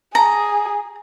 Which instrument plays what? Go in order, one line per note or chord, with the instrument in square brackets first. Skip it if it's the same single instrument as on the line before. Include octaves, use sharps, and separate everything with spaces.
[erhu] G#4 [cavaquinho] A#5